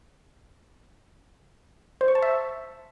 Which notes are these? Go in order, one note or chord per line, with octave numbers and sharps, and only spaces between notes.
C5
C#6
A5
E5